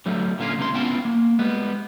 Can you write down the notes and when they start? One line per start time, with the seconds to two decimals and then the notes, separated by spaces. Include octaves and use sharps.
0.06 D3 F#3 G3 A3
0.39 A#2 D3 A#3 C#4 F4
0.58 C#2 C3 D#3 C6
0.74 B3 C#4 E4 F4 G5 A5
1.05 A#3
1.39 G3 G#3 B3